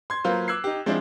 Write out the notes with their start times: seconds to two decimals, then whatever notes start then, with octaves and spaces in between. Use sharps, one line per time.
0.10 C6 G#6
0.24 F#3 A#3 F4 B4 C5
0.48 D6 E6 F#6 G#6 C7
0.64 D#4 G4
0.86 F3 G#3 C4 D4 E4 C5